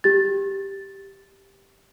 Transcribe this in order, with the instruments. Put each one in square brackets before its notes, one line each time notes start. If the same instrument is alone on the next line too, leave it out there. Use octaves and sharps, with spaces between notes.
[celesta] G4 A6